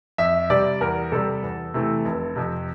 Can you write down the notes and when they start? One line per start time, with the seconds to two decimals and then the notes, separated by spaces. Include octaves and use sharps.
0.18 F2 E5
0.50 C3 G3 D5
0.81 E2 A#4
1.12 C3 G3 A4
1.43 E2
1.74 C3 E3 A3
2.05 F1
2.36 F2 C3